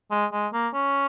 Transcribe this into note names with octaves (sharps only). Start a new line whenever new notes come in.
G#3
G#3
A#3
C#4